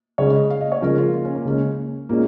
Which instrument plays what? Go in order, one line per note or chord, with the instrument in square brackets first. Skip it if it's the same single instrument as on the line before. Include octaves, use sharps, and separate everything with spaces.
[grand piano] C#3 G#3 C#4 [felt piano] C#5
[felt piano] D#5
F5
D#5
C#5
[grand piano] C#3 F3 G#3 C#4 [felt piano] A#4
[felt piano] F4
F4
C#4
A#3
[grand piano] C#3 G#3 C#4
[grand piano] A#2 G#3 C#4 [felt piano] A#3